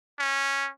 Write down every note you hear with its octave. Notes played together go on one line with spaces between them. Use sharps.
C#4